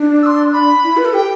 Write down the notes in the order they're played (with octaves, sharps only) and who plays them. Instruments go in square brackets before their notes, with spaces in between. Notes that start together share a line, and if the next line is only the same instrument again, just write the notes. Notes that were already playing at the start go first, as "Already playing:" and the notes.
Already playing: [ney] D4
[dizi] E6
C6
B5
[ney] E4
B4
A4
[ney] G4 [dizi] G5